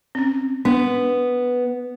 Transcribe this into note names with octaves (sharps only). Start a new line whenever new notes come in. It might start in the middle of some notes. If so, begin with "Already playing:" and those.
C4 C#4
B3 D4